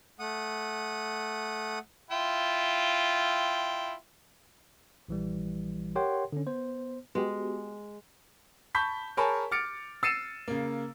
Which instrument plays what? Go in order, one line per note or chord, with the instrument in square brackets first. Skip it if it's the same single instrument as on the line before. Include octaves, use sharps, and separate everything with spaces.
[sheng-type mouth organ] A3 F#5 D#6
[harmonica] E4 F4 G5
[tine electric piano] A#1 E3 G3
G4 A#4 C#5 F#5 G5 C6
D3 C#4
B3 C5
[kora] G#3 [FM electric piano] B3 F#4 G4
[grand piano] A5 B5 C#6 G6 B6
G#4 A#4 C#5 G#5 A5 B5
D6 F6 A6 C#7 D7
E6 A6 C7 C#7 D#7 E7
C#3 A#3